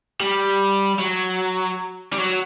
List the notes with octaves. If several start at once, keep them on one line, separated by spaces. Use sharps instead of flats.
G3
F#3
G3
F#3